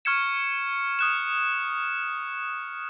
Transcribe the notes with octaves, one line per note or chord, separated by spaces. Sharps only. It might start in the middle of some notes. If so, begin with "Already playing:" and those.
C#6 F6 G#6 C#7 E7
D#6 F#6 E7